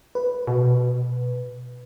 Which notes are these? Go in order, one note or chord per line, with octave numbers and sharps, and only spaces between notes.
B4
B2